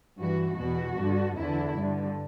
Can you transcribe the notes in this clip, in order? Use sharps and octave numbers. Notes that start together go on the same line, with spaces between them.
G2 E3 F#4
E2 B2 F#4
G2 D3
E2 D3 E4
G2 D3